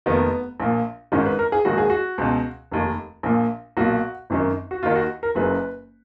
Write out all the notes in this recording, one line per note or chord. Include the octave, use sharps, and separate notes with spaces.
F1 D#2 D#3 B3
A#1 A#2
G#1 G#2 D#3 C#4
B4
A#4
G#4
A#1 G#2 D#3 F#4
G#4
F#4
C#2 B2
F1 D#2 D#3
A#1 A#2
B1 A#2 F#4
G#1 F#2 D#3
F#4
D#2 D#3 F4
F#4
A#4
F#1 F#2 C#3 B4